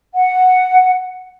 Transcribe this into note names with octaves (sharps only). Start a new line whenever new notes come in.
F#5